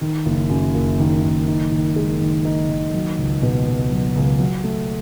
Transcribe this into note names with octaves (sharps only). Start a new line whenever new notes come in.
D#3
F#1
F#2
F#1
D#3
F#1
D#4
D#3
G#3
D#3
D#4
D#3
F#3
C#2
B2
C#2
F#3
C#2
F#3
A3